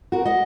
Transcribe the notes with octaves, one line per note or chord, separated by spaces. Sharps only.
F#4 A#4
D#5 F#5